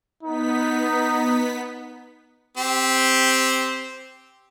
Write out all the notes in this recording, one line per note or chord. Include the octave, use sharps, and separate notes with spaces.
B3 D#4 B6
C4 G4